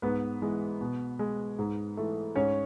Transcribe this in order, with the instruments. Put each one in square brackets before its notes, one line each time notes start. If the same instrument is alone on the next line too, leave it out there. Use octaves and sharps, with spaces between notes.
[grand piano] G#2 B3 B4
E3 G#3
B2
G#3
G#2
E3 A3
G#2 C#4 C#5